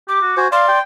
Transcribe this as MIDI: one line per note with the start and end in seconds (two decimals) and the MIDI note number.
0.09 0.20 67
0.09 0.38 86
0.22 0.34 66
0.37 0.48 66
0.37 0.48 72
0.37 0.47 80
0.52 0.79 74
0.52 0.67 77
0.52 0.79 84
0.68 0.82 79